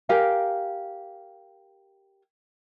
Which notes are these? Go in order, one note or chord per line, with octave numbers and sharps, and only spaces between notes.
G4 A#4 F5 G#5